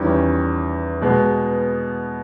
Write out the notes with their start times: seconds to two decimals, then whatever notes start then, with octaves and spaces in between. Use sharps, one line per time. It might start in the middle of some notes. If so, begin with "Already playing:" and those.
Already playing: E2 D#3 G3 C#4
1.01 B2 G#3 B3